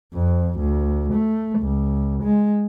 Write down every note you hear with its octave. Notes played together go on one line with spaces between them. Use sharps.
F2
D2
A3
C#2
G#3